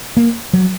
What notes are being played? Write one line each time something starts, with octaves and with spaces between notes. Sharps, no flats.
A#3
F#3